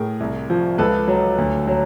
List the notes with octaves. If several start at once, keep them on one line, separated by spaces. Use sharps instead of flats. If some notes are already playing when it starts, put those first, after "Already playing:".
Already playing: A2 G#4 A#4
C2
F3
C#2 A4 B4
F#3
D2
F#3